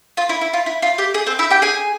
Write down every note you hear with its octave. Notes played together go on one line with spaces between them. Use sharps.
F4
E4
E4
F4
E4
F4
G4
G#4
C4 C5
E4 E5
G4 G5
G#4 G#5